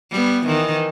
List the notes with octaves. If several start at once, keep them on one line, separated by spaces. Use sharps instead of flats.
G3 B3
D#3 E3